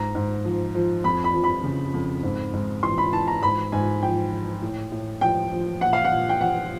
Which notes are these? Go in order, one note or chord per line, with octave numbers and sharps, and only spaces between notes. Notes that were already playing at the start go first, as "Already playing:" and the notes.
Already playing: G#2 A#5
G#2
F3
F3
F2 B5
B5
F3
B5
C#3
F2
G#2
G#2
E3 C6
B5
E3 A5
A#5
G#2 B5
G#2 G#5
F3 G5
F3
A2
A2
F3 G5
F3
A#2 F#5
F5
F#5
A#2
G5
F3 F#5